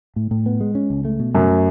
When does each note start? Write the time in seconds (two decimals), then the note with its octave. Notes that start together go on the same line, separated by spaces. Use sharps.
0.16 A2
0.31 A2
0.46 B3
0.61 G#3
0.75 C#4
0.90 C#2
1.05 A3
1.20 B2
1.34 F#2 A3